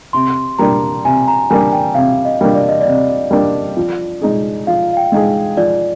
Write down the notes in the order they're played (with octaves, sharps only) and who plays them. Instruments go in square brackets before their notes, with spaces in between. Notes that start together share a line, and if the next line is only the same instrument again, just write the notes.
[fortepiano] C3 [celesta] C6
[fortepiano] G3 A#3 D4 [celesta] A#5
[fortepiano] C3 [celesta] G#5
[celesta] A#5
[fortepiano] G3 A#3 D4 [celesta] G#5
[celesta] G5
[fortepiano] C3 [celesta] F5
[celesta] D#5
[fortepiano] G3 A#3 D4
[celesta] D5
D#5
D5
[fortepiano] C3
G3 A#3 D4
F3
G#3 D#4 G#4
[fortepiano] F3 [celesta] F5
[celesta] F5
G5
[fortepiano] G#3 D#4 G#4
[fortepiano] F3 [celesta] D5